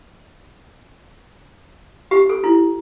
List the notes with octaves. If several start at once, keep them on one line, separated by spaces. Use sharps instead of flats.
G4
A4
E4